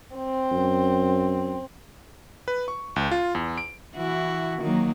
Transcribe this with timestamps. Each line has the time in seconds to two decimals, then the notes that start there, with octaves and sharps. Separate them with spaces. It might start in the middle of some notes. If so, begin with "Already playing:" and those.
0.17 C4
0.51 F#2
2.48 B4
2.68 C#6
2.96 C#2
3.11 F4
3.35 E2
3.58 D7
3.96 E3 E4 F#4
4.61 D#3 F#3 A#3